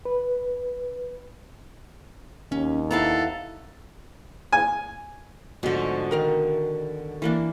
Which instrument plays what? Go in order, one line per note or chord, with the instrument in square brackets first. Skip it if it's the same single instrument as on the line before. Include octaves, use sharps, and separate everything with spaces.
[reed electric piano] B4
[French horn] D#2 [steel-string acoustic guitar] C#4
[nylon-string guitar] B3 E4 F5 [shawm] A4 [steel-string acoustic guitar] A#5
[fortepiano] G#5
[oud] G#2 F3 [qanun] B2 D3
[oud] D#3 A#4 F5
[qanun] E3 A#3 D4